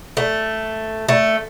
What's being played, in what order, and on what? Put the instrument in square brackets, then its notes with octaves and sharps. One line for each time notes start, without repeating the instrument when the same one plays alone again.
[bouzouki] A3
A3